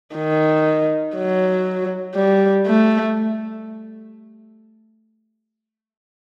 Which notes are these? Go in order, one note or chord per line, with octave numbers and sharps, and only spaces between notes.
D#3
F#3
G3
A3